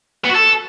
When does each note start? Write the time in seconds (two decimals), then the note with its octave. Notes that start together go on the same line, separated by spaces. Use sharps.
0.24 B3
0.30 F#4
0.35 A4